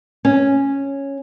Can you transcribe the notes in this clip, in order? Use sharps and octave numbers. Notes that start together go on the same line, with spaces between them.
C#4